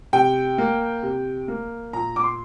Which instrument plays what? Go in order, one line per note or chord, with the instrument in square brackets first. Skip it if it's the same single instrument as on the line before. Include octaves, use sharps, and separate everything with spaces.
[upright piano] C3 G5
A#3
C3
A#3
A#2 A#5
D6
C6